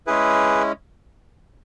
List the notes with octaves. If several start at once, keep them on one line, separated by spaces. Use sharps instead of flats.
G#3 C#4 E4 G#4 B4